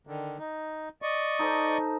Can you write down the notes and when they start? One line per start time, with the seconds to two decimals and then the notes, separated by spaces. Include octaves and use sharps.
0.07 D3 D#3
0.39 D#4
1.02 D5 D#5 C#6
1.39 D#4 A4 C5